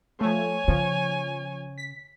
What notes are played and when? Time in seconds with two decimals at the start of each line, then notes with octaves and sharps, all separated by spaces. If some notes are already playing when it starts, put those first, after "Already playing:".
0.21 F3 A3 C#5 G#5
0.68 C#3 F3
1.78 B6